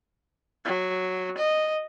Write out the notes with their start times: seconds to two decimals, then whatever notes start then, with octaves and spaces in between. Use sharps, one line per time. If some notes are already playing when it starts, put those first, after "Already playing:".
0.65 F#3
1.38 D#5